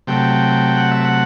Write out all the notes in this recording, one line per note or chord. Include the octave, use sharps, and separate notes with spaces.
C3 F#3 A3 G5
F#5
E5
F#5